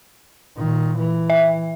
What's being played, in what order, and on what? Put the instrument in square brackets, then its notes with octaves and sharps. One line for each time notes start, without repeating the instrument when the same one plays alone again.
[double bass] A#2 D#3
E3
[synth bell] E5